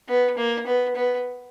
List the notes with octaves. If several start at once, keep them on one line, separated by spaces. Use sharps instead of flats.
B3
A#3
B3
B3